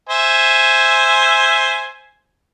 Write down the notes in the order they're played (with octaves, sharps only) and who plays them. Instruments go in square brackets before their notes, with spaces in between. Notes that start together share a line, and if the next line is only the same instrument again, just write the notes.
[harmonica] C5 E5 G#5